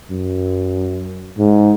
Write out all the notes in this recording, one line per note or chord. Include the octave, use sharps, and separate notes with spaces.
F#2
G#2